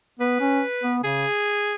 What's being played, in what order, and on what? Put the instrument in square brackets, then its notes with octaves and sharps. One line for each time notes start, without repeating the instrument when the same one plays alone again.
[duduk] B3 [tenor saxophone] B4
[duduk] C#4
B3
[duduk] C#3 [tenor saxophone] G#4